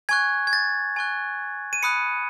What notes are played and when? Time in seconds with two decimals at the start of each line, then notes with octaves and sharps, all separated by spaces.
0.09 G#5 C#6 F#6 G#6
0.47 G#6
0.53 A6
0.96 G#5 C#6 F#6
1.73 D#7
1.83 B5 D#6 F#6 C#7